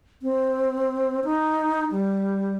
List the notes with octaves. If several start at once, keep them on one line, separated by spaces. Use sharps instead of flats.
C4
D#4
G3